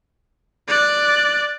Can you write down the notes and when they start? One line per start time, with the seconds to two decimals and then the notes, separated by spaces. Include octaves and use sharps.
0.68 D5 F#6